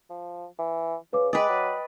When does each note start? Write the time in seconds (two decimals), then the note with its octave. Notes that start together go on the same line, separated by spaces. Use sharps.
0.10 F3
0.59 E3
1.13 C#3 B4 D6
1.33 G#3 B4 D5 D#5 G5 D#6
1.49 F#3